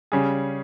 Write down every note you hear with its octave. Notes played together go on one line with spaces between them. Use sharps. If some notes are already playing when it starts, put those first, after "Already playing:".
C#3 G3 C#4 G#4